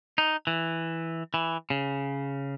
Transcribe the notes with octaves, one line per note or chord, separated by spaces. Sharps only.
D#4
E3
E3
C#3